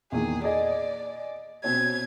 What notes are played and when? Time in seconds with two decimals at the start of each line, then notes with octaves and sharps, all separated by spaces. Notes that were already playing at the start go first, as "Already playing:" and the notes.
0.12 E2 A#2 D#3 G#4
0.44 G#4 D5 D#5
1.64 B2 C4 C#4 G#6